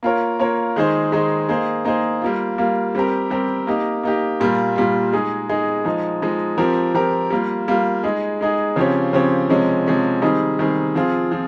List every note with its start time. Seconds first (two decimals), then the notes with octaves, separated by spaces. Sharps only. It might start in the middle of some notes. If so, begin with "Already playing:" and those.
0.03 A#3 F4 A#4 C#5
0.39 A#3 F4 A#4 C#5
0.76 D#3 G#3 D#4 G#4 C5
1.12 D#3 G#3 D#4 G#4 C5
1.49 A#3 D#4 G#4 C5
1.85 A#3 D#4 G#4 C5
2.22 G3 A#3 F4
2.58 G3 A#3 F4
2.95 G3 C4 G4 A#4
3.30 G3 C4 G4 A#4
3.67 A#3 D#4 G4
4.03 A#3 D#4 G4
4.40 A#2 G3 A#3 F4
4.76 A#2 G3 A#3 F4
5.13 G#3 D#4 G#4
5.49 G#3 D#4 G#4
5.85 F3 G#3 D#4
6.22 F3 G#3 D#4
6.58 F3 C4 G4 A#4
6.94 F3 C4 G4 A#4
7.30 G3 A#3 F4
7.68 G3 A#3 F4
8.03 G#3 D#4 G#4
8.41 G#3 D#4 G#4
8.76 C#3 F3 C4 G4 C#5
9.13 C#3 F3 C4 G4 C#5
9.49 C3 F3 G#3 C#4
9.86 C3 F3 G#3 C#4
10.22 D#3 G3 C4 D#4 G#4
10.59 D#3 G3 C4 D#4 G#4
10.95 F3 C4 F4 G#4
11.32 F3 C4